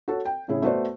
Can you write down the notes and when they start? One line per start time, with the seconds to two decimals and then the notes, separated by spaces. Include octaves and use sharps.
0.08 F#4 A4 C#5
0.25 G5
0.48 A2 C#3 E4 G#4
0.62 A3 B3 F#4 C5 D5